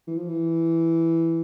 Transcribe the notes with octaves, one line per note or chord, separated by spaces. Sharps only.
E3
F3
E3